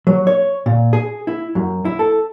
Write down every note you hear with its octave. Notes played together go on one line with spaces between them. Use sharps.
F#3
C#5
A#2
G#4
E4
F#2
E4
A4